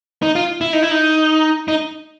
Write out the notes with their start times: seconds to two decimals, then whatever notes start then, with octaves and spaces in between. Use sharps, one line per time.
0.22 D#4
0.35 F4
0.61 E4
0.73 D#4
0.83 E4
0.91 D#4
1.68 D#4